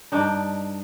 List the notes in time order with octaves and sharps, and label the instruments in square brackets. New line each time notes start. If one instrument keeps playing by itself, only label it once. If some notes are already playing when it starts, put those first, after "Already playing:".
[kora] G2 D4 D#4